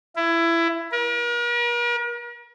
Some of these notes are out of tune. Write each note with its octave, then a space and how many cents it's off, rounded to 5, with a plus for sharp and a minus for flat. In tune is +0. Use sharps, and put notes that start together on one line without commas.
E4 +20
A#4 +45